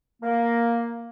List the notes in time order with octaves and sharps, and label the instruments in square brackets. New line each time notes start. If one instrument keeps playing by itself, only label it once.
[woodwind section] A#3